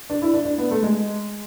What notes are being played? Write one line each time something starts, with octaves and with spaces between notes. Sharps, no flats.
D4
E4
D4
D4
B3
A3
G#3